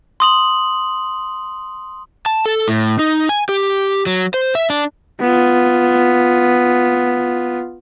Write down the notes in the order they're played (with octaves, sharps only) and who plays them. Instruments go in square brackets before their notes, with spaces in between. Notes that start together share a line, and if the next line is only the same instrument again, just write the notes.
[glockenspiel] C6 D#6 F#7
[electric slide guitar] A5
A4
A2
D#4
G#5
G4
F#3
C5
E5
D4
[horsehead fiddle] B3 F4